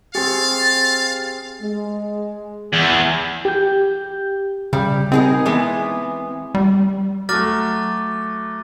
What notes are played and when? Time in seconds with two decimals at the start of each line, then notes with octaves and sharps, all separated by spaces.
0.15 C4 G4 G#4 F5 A6
1.62 G#3
2.73 E2
3.45 G4 G6
4.73 C#3 G3
5.12 C4 D#4 G#4 A#4
5.46 E3 G#3 B3
6.55 G3
7.29 F#3 A3 D6 F6 A6